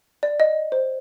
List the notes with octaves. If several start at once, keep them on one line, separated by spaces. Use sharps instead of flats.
D5
D#5
C5